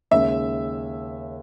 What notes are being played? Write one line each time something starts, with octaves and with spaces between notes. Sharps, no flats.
D#2 C#3 G#3 C#4 E5